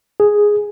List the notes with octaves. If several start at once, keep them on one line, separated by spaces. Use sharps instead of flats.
G#4